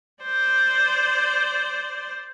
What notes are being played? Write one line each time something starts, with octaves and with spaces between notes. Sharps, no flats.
C5 D5